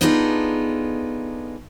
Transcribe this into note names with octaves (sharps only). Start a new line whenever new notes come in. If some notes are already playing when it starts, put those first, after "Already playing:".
B3 D4 D#4 F4 G#4 A4